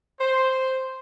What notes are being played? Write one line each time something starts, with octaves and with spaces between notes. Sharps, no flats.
C5